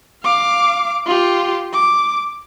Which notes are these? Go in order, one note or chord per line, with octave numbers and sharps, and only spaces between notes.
F5 D6
F4 G4
D6